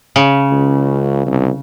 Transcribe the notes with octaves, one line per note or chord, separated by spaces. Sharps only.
C#3
C#2
C2